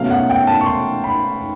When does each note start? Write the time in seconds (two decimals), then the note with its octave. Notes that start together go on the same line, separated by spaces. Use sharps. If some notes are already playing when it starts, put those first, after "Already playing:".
Already playing: B2 F#3 A3 C#4 F5
0.10 F#5
0.30 G5
0.47 A5
0.61 C#6
0.66 C6
1.04 B5